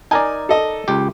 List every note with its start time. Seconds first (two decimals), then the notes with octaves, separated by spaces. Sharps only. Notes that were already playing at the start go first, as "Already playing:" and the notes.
0.11 D#4 A#4 D5 G#5
0.49 A4 D#5
0.88 C#2 G4